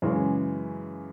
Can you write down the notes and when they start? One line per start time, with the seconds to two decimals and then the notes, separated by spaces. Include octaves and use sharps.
0.02 F#2 C#3 E3 G#3